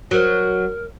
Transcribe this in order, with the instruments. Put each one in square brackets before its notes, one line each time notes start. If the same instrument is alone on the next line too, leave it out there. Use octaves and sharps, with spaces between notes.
[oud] F#3 [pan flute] A#4